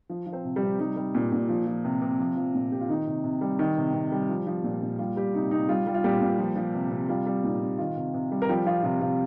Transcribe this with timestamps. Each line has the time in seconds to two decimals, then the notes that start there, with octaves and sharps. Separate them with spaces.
0.09 F3
0.26 F3
0.33 C4 C5
0.44 C3
0.56 G3 G4
0.62 C3
0.79 G3 D#4
0.96 G3
1.15 A#2
1.32 A#2
1.49 F3
1.67 F3
1.85 C3
2.02 C3
2.19 F3 F4
2.36 F3
2.55 A#2
2.72 A#2 G4
2.81 F4
2.89 D#3 D#4
3.07 C3
3.24 C3
3.41 G3
3.59 D#3
3.77 C3
3.94 C3
4.12 G3
4.29 F3
4.47 F3
4.64 A#2
4.81 A#2
4.99 G3 F4
5.16 G3 G4
5.34 C3 D#4
5.51 C3 D#4
5.69 G3 F4
5.87 G3
5.94 F4
6.04 A#2 G3 G4
6.21 A#2
6.39 F3
6.56 F3
6.74 C3
6.91 C3
7.09 G3 F4
7.26 G3
7.44 A#2 D#4
7.61 A#2
7.78 D#3 F4
7.96 C3
8.14 C3
8.31 G3
8.42 A#4
8.49 F3 G3 G4
8.66 F3 F4
8.83 C3 F4
9.01 C3 F4